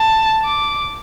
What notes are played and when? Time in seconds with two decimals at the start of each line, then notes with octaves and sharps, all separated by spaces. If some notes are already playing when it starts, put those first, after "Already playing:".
Already playing: A5
0.45 D6